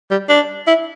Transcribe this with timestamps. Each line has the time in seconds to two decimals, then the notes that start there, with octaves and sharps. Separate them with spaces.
0.11 G3
0.29 D4
0.67 E4